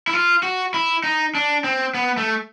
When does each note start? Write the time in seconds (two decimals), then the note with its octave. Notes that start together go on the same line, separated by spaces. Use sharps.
0.07 E4
0.13 F4
0.43 F#4
0.74 E4
1.04 D#4
1.35 D4
1.64 C4
1.94 B3
2.17 A3